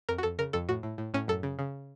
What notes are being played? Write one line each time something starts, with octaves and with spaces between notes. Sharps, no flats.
F2 A#4
F#4
F2 A4
C#3 A#4
F2 A4
A2 F#4
A2
A2
A2 C#4
F#2 A4
C#3
C#3